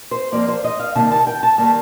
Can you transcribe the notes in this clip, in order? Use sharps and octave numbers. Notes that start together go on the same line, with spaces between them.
C5
F2 C3 F3 A#3 D5
C5
D#5
F5
C3 D#3 G3 A#3 A5
A5
G5
A5
D#3 G3 A#3 A5